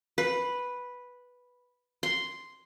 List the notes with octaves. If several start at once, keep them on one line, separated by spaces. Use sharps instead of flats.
B4
C6